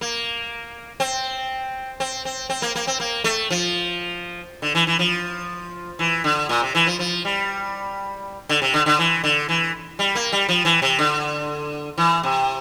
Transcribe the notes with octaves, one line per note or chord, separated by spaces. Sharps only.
A#3
C4
C4
C4
C4
A#3
A#3
C4
A#3
A3
F3
D3
E3
E3
F3
E3
D3
A#2
C3
E3
F3
F3
G3
D3
C3
D3
D3
E3
D3
E3
G3
A#3
G3
F3
E3
C3
D3
E3
C3